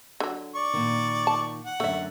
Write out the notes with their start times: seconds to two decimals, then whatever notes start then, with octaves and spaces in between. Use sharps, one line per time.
0.20 D3 F#3
0.55 D5 C#6
0.74 A#2 D#3
1.27 A5
1.65 F#5
1.80 F#2 D3 A3 C#5 E5